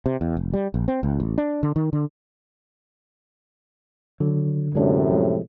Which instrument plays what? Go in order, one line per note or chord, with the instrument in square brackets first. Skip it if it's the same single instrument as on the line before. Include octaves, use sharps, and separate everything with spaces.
[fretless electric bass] C3
E2
F1
G3
A#1
C4
C#2
A1
D4
D3
D#3
D3
[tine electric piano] D3 [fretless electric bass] F#3
[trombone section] F#2 A2 C3 [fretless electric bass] G#3 A#3 D4
[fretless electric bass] F3 G#3